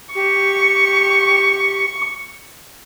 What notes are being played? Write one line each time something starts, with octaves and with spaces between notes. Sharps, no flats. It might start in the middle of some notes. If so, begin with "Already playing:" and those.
G4 C#6